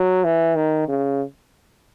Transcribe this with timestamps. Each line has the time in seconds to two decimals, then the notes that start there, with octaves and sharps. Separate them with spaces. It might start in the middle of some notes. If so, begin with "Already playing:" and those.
Already playing: F#3
0.24 E3
0.55 D#3
0.88 C#3